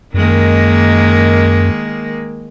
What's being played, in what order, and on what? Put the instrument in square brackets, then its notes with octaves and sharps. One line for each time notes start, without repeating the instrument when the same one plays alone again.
[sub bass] F#2 [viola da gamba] D#3 G#3 A#3